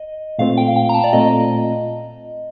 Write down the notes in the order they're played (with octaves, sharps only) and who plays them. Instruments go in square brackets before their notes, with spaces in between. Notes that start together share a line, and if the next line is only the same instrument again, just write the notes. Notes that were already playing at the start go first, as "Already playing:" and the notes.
Already playing: [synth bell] D#5
[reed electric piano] A#2 A3 C4 F4 [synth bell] F5
[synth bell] G5
F5
G5
A#5
A5
D5
[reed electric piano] A#2 A3 C4 F4 [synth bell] D#5